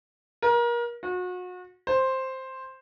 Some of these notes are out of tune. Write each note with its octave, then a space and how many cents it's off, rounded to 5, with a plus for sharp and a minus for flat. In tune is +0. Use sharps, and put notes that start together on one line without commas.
A#4 +30
F#4 -35
C5 +5